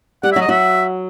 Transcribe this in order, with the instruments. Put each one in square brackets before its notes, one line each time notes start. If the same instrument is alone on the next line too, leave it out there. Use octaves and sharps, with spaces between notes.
[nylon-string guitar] G3 G4 [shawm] F#5
[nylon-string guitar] F#3 F#4 [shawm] E5
[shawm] D#5
[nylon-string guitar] F#3 F#4 [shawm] E5